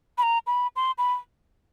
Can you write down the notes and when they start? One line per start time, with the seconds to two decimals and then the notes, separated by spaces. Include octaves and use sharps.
0.18 B5
0.23 A#5
0.47 B5
0.76 C6
0.98 B5